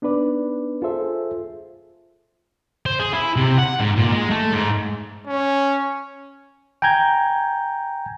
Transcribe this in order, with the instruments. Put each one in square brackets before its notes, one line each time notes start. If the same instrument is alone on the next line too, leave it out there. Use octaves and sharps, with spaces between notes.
[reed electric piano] B3 D4 D#4 B4 D5
F4 G#4 A4 C5 E5
[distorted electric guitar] C5
G#4
E4
C3
F#5
G#2
A#2
G#3
A3
G#2
[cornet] C#4
[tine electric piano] G5 G#5 A#5 G6 G#6